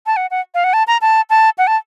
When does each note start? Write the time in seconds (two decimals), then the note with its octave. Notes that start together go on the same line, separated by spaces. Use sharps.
0.06 A5
0.16 F#5
0.31 F#5
0.54 F5
0.64 F#5
0.73 A5
0.87 A#5
1.01 A5
1.30 A5
1.58 F#5
1.67 A5